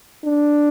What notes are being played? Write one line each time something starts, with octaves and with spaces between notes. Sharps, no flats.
D4